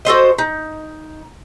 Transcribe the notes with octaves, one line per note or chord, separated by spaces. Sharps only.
F#4 A4 C5 D#5
D#4